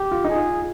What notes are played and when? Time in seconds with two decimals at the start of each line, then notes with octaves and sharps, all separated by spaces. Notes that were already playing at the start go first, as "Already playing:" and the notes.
Already playing: G4
0.11 F4
0.24 D#4
0.30 G#4
0.36 F4